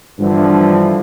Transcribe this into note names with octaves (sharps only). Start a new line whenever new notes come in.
G2 D3 E3 F3